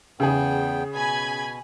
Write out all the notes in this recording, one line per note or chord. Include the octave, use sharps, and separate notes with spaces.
E2 C#3 B3 G#4 G5
B2 G#5 B5 G#6